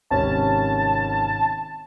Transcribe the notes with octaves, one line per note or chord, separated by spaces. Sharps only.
G#1 C3 C#4 A5